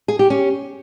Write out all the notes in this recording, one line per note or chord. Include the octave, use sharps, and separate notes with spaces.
G#4
G4
C#4